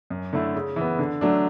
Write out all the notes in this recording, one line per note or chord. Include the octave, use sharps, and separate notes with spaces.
F#2
D3 A3 E4
C#3
E3 B3
D3
F#3 A3 D4